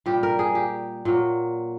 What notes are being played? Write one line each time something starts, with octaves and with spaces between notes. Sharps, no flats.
A#2 G3 G4
A#4
G#4
G4
A#2 F#3